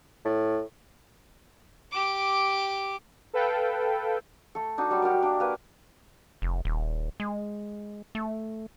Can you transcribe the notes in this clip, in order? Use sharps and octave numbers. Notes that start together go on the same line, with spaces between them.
A2
G4 D6
A4 B4 F5 G5
A3 A4
D4 D#4 F#4
F#3 G3 D#4
F#4 G4 A#4 D5
A#3 D4
A#3 B4
F1
D#1
G#3
A3